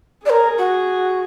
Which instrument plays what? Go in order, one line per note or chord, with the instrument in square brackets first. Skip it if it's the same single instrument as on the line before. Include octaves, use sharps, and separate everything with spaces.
[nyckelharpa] G#4 [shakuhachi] D5
[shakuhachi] A#4
F#4